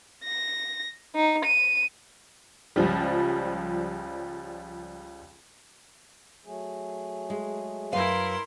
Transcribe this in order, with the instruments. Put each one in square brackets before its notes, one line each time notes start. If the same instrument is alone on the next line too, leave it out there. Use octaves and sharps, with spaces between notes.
[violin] A#6
D#4
D#7
[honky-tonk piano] C#2 F3 G3
[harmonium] F#3 A3 G#4
[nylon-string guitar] G#3
[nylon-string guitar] F#2 B4 F5 [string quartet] E4 A#4 C6